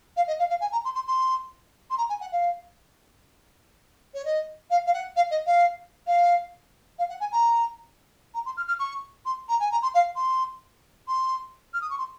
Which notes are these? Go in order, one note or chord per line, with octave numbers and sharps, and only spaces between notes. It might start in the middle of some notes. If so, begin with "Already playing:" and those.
F5
D#5
F5
F5
G#5
A#5
C6
C6
C6
C6
A#5
G#5
F#5
F5
C#5
D#5
F5
F5
F#5
F5
D#5
F5
F5
F5
F#5
G#5
A#5
A#5
C6
F6
F6
C#6
C6
A#5
G#5
A#5
C6
F5
C6
C6
F6
D#6
C#6
C6